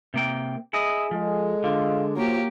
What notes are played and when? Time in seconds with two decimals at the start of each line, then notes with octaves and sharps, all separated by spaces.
0.14 C3 A#3 G5
0.73 E4 G#4 D#5
1.11 F3 G#3 A4 D#5
1.64 D3 F4
2.16 F3 F#3 A#3 F4 G4